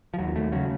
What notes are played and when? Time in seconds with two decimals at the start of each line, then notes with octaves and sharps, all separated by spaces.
0.14 F3
0.19 D#2 F#3
0.36 A3
0.52 C#3 F#3